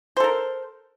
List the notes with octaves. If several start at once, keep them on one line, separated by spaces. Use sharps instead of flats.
A4 A#4 C5